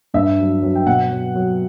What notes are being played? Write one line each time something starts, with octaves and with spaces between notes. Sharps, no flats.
G2 E5
F#3
F#3
G5
B2 F#5
F#3
F#3